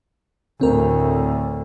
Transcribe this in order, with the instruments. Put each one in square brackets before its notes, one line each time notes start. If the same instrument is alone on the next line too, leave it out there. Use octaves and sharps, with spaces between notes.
[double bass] D2 A2 [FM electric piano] C4 A#4